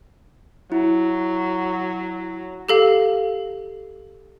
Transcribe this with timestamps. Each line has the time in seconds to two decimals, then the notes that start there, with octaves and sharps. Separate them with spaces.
0.72 F#3 E4
2.69 G4 A4 F5